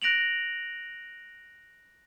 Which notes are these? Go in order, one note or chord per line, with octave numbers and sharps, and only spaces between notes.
F#6 A#6 D7 F7 F#7